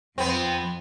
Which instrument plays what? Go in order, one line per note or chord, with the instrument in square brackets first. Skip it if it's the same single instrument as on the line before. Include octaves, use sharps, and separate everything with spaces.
[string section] F2 [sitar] B3 C4